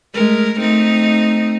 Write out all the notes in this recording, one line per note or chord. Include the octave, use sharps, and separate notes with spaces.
G#3 A3 A#4
A3 C4 D#4